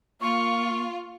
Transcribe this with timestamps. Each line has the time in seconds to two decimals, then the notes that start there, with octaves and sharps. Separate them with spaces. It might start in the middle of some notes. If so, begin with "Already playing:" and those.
0.21 A#3 F4 C#6